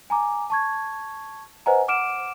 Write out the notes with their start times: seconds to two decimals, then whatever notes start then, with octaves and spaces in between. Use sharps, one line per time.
0.10 G#5 A#5 D6
0.50 A5 C#6 G#6
1.66 B4 C5 D#5 F#5 G#5 A#5
1.88 F#5 D6 F6 D7 E7